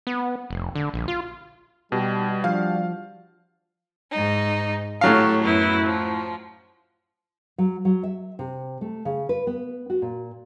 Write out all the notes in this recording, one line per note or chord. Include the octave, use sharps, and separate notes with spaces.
B3
F1
D3
A#1
F4
B2 G3 D#4 G4
F3 D4 F#4 G4 F5
G#2 D#4
A2 F#3 G4 A4 F5
F#2 B3 E4
F3
F#3
F#3
E5
C3
A3
C#3
B4
B3
F#4
A#2